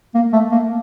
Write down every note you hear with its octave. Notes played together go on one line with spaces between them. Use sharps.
A#3
A3
A#3